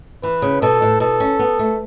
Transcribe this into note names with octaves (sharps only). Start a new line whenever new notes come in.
E3 B4
C#3
B2 A4
A2
B2 A4
C#4
B3
A3